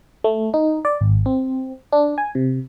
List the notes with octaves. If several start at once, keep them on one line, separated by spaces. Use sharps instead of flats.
A3
D#4
D5
G#1
C4
D4
G#5
C3